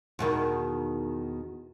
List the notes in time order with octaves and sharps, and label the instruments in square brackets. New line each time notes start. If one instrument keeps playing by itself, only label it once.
[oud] E2 B2 D#3